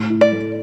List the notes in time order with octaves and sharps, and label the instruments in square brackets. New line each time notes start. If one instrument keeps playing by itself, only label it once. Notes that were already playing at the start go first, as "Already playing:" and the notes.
Already playing: [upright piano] A2
E4
[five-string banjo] D5
[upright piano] A3